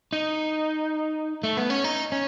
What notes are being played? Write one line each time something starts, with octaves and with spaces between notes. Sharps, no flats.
D#4
A3
B3
C#4
D#4
C#4